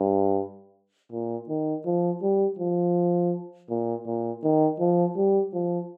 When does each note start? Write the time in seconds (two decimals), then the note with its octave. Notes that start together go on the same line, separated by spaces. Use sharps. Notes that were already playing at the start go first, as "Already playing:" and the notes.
Already playing: G2
1.12 A#2
1.49 D#3
1.86 F3
2.22 G3
2.59 F3
3.70 A#2
4.06 A#2
4.44 D#3
4.80 F3
5.16 G3
5.54 F3